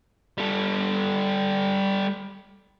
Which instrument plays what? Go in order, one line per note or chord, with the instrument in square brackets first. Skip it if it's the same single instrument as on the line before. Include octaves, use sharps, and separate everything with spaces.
[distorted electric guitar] G3 A4